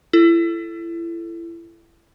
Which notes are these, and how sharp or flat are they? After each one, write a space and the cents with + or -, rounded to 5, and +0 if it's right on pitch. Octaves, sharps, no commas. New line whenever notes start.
E4 +30 A4 +0